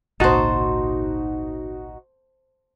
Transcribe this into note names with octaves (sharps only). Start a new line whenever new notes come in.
G#1 C#2 A#2 D#4 F#4 C5 A5